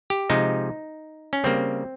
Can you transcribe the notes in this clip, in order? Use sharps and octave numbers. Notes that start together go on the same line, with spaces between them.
G4
C3 F3 G#3 D#4
C#4
C#3 G3 A#3 C4